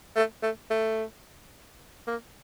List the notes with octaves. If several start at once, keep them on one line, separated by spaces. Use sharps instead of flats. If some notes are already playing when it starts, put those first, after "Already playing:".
A3
A3
A3
A#3